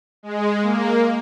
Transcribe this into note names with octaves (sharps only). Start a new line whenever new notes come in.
G#3
A#3